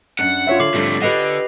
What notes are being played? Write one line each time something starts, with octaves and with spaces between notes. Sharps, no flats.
F#2 D4 F#5
F4 C#5 E5
D3 D6 C7 F#7
F2 G#2 D3 G3 A3
D3 G4 B4 D#5 F#5 A#6 C7 F7